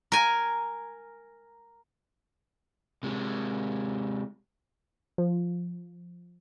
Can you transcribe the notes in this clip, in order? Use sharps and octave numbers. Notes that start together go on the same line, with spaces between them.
A#4 G#5
C3 G#3
F3